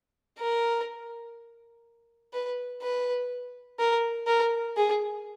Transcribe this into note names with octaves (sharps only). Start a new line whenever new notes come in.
A#4
B4
B4
A#4
A#4
G#4